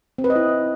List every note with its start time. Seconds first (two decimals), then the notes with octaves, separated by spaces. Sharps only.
0.18 C4
0.24 B4
0.30 D#5
0.36 E4